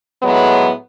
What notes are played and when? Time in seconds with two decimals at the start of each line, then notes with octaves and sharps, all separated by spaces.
0.23 A2 F#3 G#3 B3